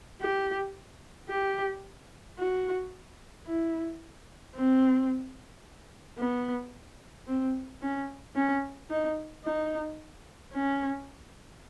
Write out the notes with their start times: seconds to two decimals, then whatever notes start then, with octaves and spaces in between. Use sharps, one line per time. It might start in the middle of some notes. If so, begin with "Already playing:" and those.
0.21 G4
1.29 G4
2.39 F#4
3.46 E4
4.56 C4
6.19 B3
7.27 C4
7.82 C#4
8.35 C#4
8.90 D#4
9.44 D#4
10.53 C#4